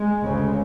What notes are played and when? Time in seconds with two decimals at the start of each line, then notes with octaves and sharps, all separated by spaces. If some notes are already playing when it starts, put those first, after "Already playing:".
Already playing: G#3
0.22 D2 C#3